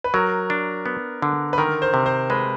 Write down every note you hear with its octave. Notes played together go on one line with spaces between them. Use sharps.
B4
F#3 A#4
D4
B3
D3
B4
D#3 A#4
C5
C3
C5
G#3 B4